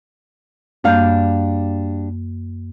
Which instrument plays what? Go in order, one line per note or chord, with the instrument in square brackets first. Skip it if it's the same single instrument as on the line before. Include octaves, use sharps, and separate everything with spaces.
[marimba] F#2 A#3 G6 [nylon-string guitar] G3 D4 F5